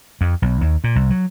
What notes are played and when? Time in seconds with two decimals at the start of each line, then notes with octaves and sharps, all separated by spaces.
0.21 F2
0.42 B1
0.61 D#2
0.84 A#2
0.96 C2
1.10 F#3